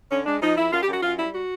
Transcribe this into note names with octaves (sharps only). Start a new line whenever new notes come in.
D3 C#4
G#3 D4
F3 D#4
F2 E4
F#2 F4
G4
F#2
F#4
F#2 F4
G3 E4
F#4